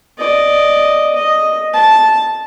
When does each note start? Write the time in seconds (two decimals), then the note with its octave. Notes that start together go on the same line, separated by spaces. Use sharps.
0.18 D5 D#5
1.14 D#5
1.73 A5